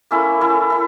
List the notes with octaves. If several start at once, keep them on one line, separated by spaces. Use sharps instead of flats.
A#3 C#4 E4 A4
A#3 C#4 E4 A4
E4 A4